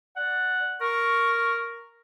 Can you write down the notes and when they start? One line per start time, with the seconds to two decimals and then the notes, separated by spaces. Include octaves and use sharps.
0.17 D5 F#5
0.81 A#4 C#6